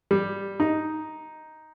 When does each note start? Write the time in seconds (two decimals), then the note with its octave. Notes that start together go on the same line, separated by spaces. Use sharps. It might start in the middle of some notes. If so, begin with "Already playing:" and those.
0.11 G3
0.60 D#4